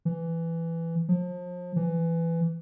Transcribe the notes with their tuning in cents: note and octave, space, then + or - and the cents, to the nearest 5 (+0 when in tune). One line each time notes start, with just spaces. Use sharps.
E3 +10
F3 +35
E3 +15